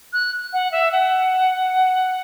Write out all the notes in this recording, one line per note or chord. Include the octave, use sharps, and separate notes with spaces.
F#6
F#5
E5
F#5